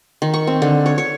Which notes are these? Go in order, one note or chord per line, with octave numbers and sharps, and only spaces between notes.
D#3
C#6
C4
D3
C#5
C#5